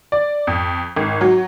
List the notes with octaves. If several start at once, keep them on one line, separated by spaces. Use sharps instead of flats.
D5
F2
G#1
F#3